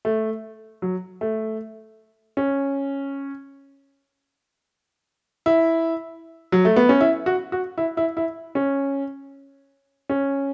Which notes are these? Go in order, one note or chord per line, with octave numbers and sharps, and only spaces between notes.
A3
F#3
A3
C#4
E4
F#3
A3
B3
C#4
E4
F#4
F#4
E4
E4
E4
C#4
C#4